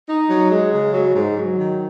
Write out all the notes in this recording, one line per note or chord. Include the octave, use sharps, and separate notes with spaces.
D#4
F#3
G#3
C#3
F#3
G#2
F#3
D#3